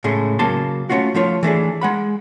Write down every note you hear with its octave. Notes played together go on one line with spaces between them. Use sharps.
A2 C#3 G#3 A3
C#3 F#3 A#3 A5 C6
A3 A#3 C#4 F4 F#4
F3 A3 F4 C#5
E3 A3 D4 G#4
G#3 F#5 B5